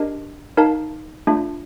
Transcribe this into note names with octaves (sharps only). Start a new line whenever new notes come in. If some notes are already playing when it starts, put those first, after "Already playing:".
Already playing: D4 G4 A#4 D#5
D#4 A#4 F5 A5
A3 D4 F4